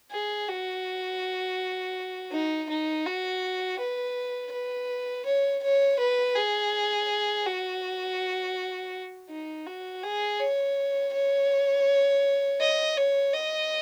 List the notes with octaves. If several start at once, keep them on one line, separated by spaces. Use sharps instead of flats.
G#4
F#4
D#4
D#4
F#4
B4
B4
C#5
C#5
B4
G#4
F#4
D#4
F#4
G#4
C#5
C#5
D#5
C#5
D#5